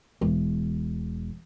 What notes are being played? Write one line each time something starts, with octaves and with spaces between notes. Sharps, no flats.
E1 E2